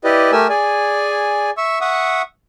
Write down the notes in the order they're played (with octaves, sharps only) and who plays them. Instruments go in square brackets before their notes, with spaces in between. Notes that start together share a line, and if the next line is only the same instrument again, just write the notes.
[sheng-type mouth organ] E4 G4 B4 D5 D#5
A3 G4 A#4 G#5 E6
G#4 D5 G#5
E5 C#6 E6
E5 F#5 C#6 D#6